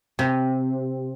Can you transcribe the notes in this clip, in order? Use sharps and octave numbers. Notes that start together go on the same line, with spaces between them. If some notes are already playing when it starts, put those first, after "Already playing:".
C3